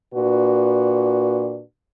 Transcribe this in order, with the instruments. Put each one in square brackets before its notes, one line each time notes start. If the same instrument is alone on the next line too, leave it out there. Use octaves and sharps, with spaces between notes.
[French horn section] A#2 D4 F#4 B4